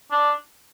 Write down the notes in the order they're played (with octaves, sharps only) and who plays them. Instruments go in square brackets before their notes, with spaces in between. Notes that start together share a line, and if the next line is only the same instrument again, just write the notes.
[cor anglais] D4